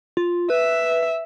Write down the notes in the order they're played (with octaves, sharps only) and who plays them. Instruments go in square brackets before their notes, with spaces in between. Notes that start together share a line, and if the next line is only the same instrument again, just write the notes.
[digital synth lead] F4
[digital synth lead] B4 [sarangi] E5